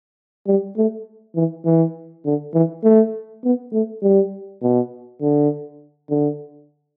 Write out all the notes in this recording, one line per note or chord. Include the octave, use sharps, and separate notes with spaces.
G3
A3
E3
E3
D3
E3
A3
B3
A3
G3
B2
D3
D3